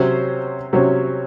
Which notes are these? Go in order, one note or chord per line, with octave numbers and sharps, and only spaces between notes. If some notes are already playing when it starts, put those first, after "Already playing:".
Already playing: C3 F#3 C#4 C5
C3 F#3 C#4